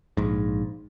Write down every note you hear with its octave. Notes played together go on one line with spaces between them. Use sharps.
A#1 G#2